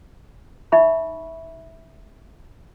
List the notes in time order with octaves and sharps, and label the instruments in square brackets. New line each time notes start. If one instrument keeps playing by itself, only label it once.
[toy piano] D#4 E5 B5 C#6